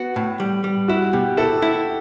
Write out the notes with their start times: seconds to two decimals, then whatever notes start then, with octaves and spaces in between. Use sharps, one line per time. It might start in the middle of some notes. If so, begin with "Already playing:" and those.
Already playing: B3 F#4
0.16 A2
0.40 G3
0.64 G3
0.88 E4 F#4
1.13 B2 G4
1.37 E4 A4
1.62 E4